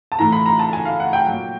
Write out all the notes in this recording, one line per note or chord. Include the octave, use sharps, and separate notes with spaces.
A5
A2 E3 A#5
B5
A#5
A5
G#5
F5
F#5
G5
A#2 F#3